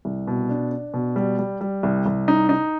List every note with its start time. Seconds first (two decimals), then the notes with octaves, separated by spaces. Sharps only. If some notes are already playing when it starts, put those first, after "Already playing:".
0.05 C2
0.27 B2
0.49 D4
0.71 D4
0.94 B2
1.16 G3
1.39 G3
1.61 G3
1.83 C2
2.06 C2
2.28 D#4
2.49 D#4